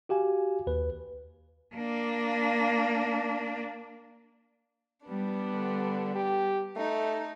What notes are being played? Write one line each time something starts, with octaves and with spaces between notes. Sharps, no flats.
F#4 G4 F5 G#5
D#2 B4
A#3 D4
G3 B3 D4
D3
G4
A3 D#4